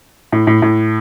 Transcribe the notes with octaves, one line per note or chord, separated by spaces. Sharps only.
A2
A2
A2